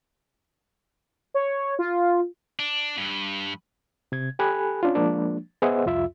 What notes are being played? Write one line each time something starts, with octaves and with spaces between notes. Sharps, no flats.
C#5
F4
D4
G2
C3 G#6
G4 A4 G#5 B5 F#6
C#4 D4 F4
F3 G#3 A#3 D4
B3 G#4 C5 D#5 E5 F#5
C2 F2 F4 E5